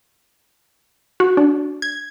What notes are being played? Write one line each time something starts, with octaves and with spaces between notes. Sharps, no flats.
F#4
D4
G#6